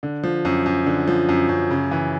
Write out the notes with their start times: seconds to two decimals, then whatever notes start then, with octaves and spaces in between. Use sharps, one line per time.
0.03 D3
0.24 F3
0.45 F#2
0.66 F#2
0.86 D3
1.08 F3
1.29 F#2
1.49 F#2
1.70 C#3
1.91 E3